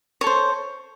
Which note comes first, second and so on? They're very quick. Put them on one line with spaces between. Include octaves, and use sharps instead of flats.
C#5 A4 C5